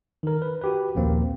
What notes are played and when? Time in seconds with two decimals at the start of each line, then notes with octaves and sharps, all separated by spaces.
0.23 D#3 A#4
0.42 B4
0.62 F#4 G4 B4
0.95 A#1 D#2 A#3 C4